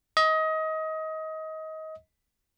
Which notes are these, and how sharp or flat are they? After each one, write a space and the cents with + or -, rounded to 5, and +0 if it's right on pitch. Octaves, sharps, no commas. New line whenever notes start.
D#5 +25